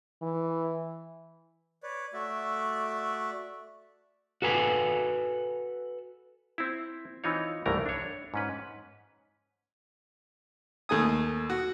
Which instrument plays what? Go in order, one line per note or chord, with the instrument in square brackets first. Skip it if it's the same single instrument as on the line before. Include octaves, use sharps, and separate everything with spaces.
[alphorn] E3
[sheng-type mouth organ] B4 C#5 D5
A3 F#4 D5 E5
[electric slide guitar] F#4 A4 B4 G#5
[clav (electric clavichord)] C4 E4
E3 C4 D#4 F4 C#5
C2 G2 E3 A3 A#4 A#5
D4 C#5
G#2 C#4 B4
[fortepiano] D#2 A3 G#5 D#6
F#4